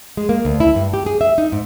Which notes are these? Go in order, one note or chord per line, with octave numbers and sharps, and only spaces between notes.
G#3
A#3
D2
E4
G2
G4
G#4
E5
D#4
G#2